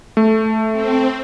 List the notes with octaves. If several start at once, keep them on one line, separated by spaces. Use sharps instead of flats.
A3
C4